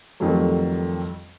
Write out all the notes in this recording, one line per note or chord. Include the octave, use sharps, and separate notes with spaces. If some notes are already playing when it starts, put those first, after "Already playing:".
F2 D#3 F#3 G3 A3